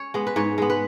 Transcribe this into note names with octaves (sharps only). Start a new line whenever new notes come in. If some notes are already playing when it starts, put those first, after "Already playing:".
Already playing: C#4 C#5
G#3 B3
B4
G#2 C#5
G#3 B3
B4